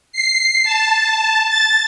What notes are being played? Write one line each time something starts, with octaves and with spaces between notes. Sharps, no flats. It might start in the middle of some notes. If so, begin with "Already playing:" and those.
C7
A5
A6